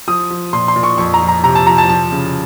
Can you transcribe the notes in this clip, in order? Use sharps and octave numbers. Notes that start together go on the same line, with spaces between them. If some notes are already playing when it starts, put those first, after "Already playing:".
F3 D#6
F3
A#2 C6
C6
A#2
C#6
F2 C#6
A#5
F3
A#5
C3 A#5
A5
F3 A#5
A5
F3 A5
C#3